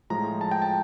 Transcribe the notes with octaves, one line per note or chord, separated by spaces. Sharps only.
A2 F3 G#3 A#5
A5
G5
A5